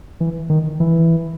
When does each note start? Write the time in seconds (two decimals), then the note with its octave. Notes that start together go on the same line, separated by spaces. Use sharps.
0.20 E3
0.50 D#3
0.80 E3